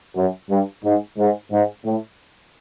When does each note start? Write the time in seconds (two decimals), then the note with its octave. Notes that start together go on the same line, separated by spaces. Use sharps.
0.16 F#2
0.50 G2
0.84 G#2
1.18 G#2
1.52 G#2
1.85 A2